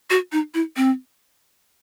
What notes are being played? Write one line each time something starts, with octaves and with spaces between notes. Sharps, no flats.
F#4
D#4
E4
C4